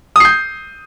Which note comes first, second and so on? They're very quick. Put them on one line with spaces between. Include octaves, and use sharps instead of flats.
D#6 C7 G6